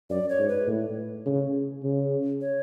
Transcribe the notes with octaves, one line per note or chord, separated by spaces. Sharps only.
F#2 D5
C#5
G#2
B4
A2
C#3
C#3
C#5